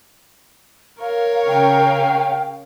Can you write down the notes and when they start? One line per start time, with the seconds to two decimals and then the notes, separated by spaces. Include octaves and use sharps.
1.01 A#4 C#5 F5
1.47 C#3 C#4 F5 G5